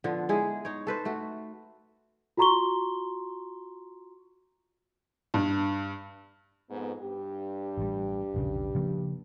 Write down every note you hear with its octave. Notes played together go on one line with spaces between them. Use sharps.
D3 F3 B3
G#3 E4 G#4
D#4 C#5
A4 B4 C5
A3 F#4
F4 F#4 A#5 C6 C#6 G7
G2
F2 G#2 B3
G2 G4
A1 G3
E1 A#1 C#3
C#3 F3 A#3